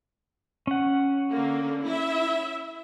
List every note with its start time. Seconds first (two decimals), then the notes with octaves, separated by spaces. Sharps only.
0.67 C#4 F#5
1.31 D3 A#3
1.85 E4 E5